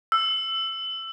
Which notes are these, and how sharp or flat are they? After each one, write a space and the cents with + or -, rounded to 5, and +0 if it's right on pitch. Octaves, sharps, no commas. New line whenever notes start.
E6 +15